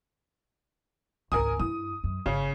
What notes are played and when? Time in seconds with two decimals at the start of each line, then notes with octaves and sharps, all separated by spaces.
1.32 G#1 C#2 A#4 G#5 D#6
1.60 G2 E4 D#6
2.04 F#2
2.26 G1 C#3 C#4